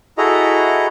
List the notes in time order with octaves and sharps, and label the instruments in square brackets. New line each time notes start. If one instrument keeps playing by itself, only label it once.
[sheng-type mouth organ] E4 F#4 G#4 A4 D#5 A#5